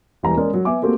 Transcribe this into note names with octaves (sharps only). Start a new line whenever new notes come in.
E1 E3 G3 A#5
G#3 C#4 G#4 A#4 D5
F#3
B3 E5 G#5 D6
A3 A#3 C4 F#4 G4